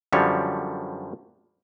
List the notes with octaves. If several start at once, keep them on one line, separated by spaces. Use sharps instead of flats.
F#2 D3 F3 G3 C#5